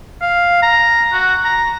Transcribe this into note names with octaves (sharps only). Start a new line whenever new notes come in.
F5
A#5
F#4
A#5